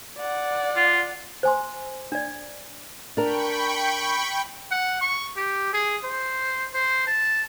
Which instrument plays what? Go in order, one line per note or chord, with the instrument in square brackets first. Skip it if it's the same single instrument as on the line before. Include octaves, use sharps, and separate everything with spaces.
[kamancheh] D5 F#5
[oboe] F4
[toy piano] C5 G#5 C6
D4 D5
[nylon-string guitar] D4 A#4 [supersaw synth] G5 B5 C#6
[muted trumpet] F#5
C#6
G4
G#4
C5
C5
A5